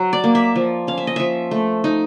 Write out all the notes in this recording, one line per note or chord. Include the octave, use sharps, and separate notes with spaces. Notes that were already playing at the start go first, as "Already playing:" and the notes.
Already playing: F#3
D5
A#3
E5
F3
C#4 F5
E5
D#5
F3 E5
A3
D#4